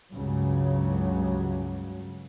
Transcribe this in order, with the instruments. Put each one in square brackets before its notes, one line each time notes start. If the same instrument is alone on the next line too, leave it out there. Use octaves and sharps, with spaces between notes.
[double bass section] C#2 G2 C#3 F#3